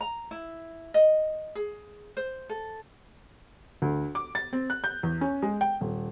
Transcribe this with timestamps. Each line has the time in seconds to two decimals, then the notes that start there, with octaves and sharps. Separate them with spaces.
0.01 A#5
0.31 E4
0.94 D#5
1.55 G#4
2.17 C5
2.49 A4
3.82 D2
4.15 D6
4.35 A6
4.53 C4
4.70 F#6
4.84 G6
5.03 E2
5.21 C#4
5.43 G#3
5.61 G5
5.81 D#1